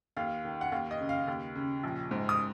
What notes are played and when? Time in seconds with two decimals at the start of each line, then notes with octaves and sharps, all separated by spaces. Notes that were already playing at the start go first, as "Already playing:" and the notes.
0.17 D#2 F5
0.45 D#3
0.61 F#5
0.72 D#2 F5
0.91 D#5
1.01 C#3
1.09 F5
1.28 D#2
1.55 C#3
1.83 A#1
2.11 G#2
2.29 D#6